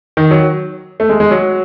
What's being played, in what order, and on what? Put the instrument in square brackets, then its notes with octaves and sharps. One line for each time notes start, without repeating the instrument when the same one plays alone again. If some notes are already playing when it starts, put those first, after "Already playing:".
[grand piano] D#3
F#3
A3
G#3
G#3
F#3